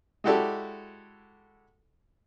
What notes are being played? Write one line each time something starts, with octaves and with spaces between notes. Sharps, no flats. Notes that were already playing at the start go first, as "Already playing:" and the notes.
G#3 E4 F#4 G4 A4 D5